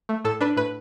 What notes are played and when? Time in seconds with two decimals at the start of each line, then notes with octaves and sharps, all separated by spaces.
0.09 A3
0.25 A2 A4
0.41 D4 B4
0.57 A2 B4